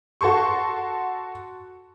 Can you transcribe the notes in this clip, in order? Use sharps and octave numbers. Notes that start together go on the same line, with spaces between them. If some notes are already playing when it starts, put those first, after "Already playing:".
F#4 A4 A5 C6 C#6